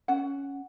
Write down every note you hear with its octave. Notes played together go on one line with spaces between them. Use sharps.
C#4 F#5